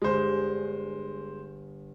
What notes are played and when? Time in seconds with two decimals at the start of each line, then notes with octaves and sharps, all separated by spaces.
0.02 G1 G#3 D4 C5 D#6